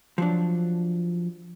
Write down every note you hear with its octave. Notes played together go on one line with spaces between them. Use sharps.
F3 F#3 D4